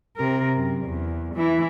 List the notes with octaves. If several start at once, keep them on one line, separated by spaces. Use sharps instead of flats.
C3 A#4
F#2
E2
E3 E4